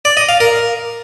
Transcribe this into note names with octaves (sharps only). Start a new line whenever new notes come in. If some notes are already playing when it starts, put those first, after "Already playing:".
D5
D#5
F5
A#4